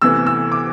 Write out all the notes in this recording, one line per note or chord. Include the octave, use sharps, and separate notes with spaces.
D2 C3 E3 B3 E6
E6
D6